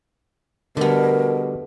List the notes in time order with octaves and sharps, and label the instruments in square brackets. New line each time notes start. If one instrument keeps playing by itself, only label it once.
[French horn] B2 [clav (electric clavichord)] D3 G3 [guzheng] A3 B3 [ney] A#4